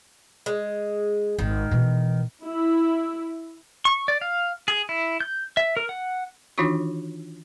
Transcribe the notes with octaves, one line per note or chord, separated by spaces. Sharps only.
G#3
G#1 D#3
B2 E3
E4
C#6
D5
F5
G#4
E4
G6
E5
A#4
F#5
D#3 E3 D4 D#4 F4 F#4